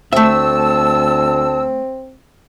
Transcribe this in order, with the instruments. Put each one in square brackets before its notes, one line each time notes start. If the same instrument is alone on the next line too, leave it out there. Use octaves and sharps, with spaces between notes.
[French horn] D2 [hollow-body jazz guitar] A3 E5 [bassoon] C4 [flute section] A5 E6